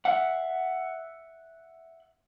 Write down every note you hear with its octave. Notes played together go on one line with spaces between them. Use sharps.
E5 F#5